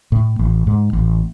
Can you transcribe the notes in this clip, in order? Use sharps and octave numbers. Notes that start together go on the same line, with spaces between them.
A2
A1
G#2
A1